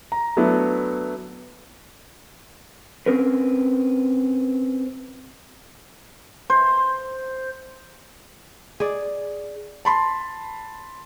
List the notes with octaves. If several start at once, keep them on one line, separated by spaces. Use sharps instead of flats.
A#5
F#3 A3 B3 D4 E4
C4 C#4 A#4 B4
C5
G#4 D5
A5 B5 C6